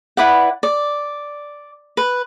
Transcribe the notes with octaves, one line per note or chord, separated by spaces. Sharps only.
E4 B4 D5 F#5
D5
B4